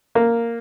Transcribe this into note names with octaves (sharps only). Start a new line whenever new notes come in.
A#3